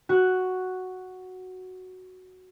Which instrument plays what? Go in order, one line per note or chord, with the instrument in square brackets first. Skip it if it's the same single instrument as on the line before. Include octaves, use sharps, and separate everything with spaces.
[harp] F#4 F#6